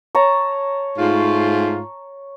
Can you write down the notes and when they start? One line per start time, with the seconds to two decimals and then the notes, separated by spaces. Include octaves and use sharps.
0.15 C#5 A5 A#5
0.98 G#2 A3 F4